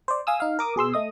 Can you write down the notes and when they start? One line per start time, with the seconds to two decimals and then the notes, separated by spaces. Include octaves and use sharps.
0.08 C5 D5
0.27 F5 G#5 D#6 E6
0.40 D#4 F5
0.59 A#4 D6 D#6
0.76 B2 G#4 C6 E6
0.94 A3 D#5 D#6